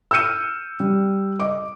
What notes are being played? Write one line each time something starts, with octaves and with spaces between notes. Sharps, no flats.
E6 F6 G6 C#7 D#7
G3
D#5 D6